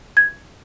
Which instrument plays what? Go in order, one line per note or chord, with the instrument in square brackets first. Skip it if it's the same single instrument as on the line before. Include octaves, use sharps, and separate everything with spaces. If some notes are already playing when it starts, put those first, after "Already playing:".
[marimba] G#6